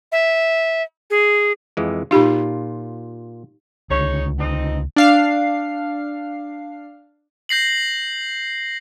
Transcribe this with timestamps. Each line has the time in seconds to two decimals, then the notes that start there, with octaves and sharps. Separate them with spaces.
0.12 E5
1.10 G#4
1.77 F2 E3 G#3
2.11 A#2 D#4 F4 G4 B5
3.90 C#2 D3 D#4 G#4 C#5
4.39 F2 C4 D#4
4.96 D4 F5 C7
7.49 G6 A#6 C7 F#7